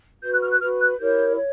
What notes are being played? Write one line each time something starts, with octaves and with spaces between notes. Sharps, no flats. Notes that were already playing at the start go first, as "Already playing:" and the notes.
F#4 B4 G6
F#6
F6
F#6
F#4 B4 F6
F#6
E4 G4 A#4 C#5 G6
C#5